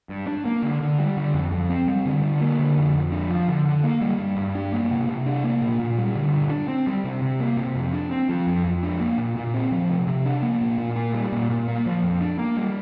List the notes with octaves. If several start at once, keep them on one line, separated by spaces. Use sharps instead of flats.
G2
D4
A#3
D3
D3
G3
D3
F2
F2
C4
G3
D3
D3
A#3
D3
F2
F2
D4
F3
D3
D3
A#3
G3
G2
G2
D4
A#3
C3
C3
D4
A#3
A#2
A#2
G3
D3
G2
D4
C4
G3
C3
C3
A#3
C3
F2
D4
C4
F3
F2
F2
D4
A#3
A#2
A#2
C4
F3
C3
C3
D4
A#3
A#2
A#2
A#3
G3
A#2
A#2
A#3
F3
F2
D4
A#3
G3